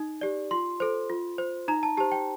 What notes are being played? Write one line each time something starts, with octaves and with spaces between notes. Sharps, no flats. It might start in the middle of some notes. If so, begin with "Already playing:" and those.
Already playing: D#4
G4 D5
F4 C6
A4 C5
F4
C5
D#4 A#5
A5
G4 C5 A5
G5